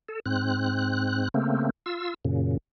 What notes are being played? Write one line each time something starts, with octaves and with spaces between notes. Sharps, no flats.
A4
G#2 C4 F#6
C#3 A3 A#3 C4
F4 E6
F#2 A#2 C#3